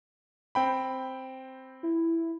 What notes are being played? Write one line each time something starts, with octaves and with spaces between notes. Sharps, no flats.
C4 G5 B5
E4